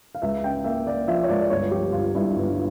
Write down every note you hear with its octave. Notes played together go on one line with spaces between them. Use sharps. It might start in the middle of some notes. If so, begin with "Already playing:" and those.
F5
C#2 E5
C#3 G5
A#3 E5
A#3 D5
F3 E5
C#5
C#2 D5
D5
G1 C#5
F3 G4
G1 F4
G2 E4
F4
G1
F4